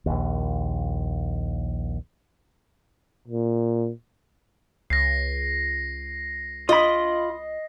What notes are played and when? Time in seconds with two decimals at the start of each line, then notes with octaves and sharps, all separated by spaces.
0.06 A#1 D#2
3.28 A#2
4.90 C#2 A#6 C7
6.69 F4 D#5 B5